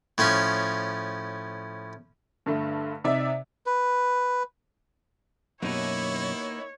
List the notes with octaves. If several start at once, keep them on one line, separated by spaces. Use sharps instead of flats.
A2 F3 C#4
G2 D3 A3
C3 D#4 D5 E5
B4
F#2 B2 A#3 B3 D#4 E4 C#5